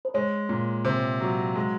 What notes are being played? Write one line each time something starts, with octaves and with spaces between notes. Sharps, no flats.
C5
G#3 C#5
A#2
C3 C5
F#3
G#3